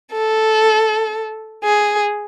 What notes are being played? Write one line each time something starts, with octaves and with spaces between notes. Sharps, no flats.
A4
G#4